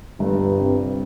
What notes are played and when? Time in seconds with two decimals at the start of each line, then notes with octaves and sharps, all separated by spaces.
0.20 G1 G2
0.60 C3